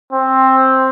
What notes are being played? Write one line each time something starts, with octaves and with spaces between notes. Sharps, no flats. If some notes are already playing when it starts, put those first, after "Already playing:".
C4